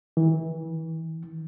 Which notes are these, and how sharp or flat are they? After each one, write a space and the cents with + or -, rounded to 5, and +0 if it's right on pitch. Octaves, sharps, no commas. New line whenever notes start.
E3 -30